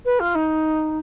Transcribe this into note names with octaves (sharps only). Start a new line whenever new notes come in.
B4
F4
D#4